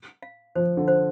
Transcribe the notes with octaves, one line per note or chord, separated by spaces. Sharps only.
F5
F3 C5
D3
C5